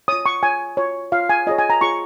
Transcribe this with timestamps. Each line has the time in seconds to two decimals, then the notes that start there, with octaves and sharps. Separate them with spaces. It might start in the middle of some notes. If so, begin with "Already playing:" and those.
0.08 F4 C#5 D#6
0.26 C#6
0.43 F4 C#5 G#5
0.77 F4 C#5
1.12 F4 C#5 F5
1.29 G#5
1.47 F4 G#4 C#5 D#5
1.58 G#5
1.70 A#5
1.81 F4 G#4 C#5 C#6